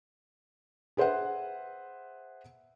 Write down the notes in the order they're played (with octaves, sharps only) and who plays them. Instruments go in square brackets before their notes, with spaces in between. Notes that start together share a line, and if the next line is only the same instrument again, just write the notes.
[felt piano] G#4 B4 C5 E5 F#5